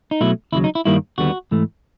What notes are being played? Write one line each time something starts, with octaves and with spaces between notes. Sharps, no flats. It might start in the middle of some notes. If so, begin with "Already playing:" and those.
D#4
B2 F#3 A3 E4
D#2 C#3 F#3 E4
D#4
E4
G2 D#3 G3 A#3 E4
D#2 D3 G3 B3 F#4
G#2 E3 A3